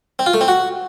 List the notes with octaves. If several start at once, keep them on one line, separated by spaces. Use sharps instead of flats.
C4
F4
A3
C4
F#4